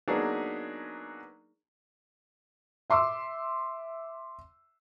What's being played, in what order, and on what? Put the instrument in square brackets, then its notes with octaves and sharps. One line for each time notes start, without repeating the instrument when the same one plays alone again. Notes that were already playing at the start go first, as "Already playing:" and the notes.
[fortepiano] F#3 A#3 B3 D4 D#4 G#4
[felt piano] E5 C6 D6 E6